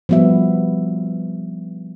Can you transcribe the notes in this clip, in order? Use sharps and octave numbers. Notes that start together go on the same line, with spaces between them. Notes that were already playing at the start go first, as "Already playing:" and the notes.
F3 G3 B3 F#4 E5